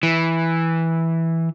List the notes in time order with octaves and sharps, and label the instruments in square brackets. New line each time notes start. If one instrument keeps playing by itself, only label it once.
[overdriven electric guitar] E3